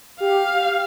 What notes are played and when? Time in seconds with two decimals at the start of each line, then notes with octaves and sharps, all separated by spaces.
0.20 G4 F5